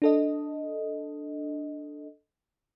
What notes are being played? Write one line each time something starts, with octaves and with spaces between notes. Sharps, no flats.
D4 A4 D#5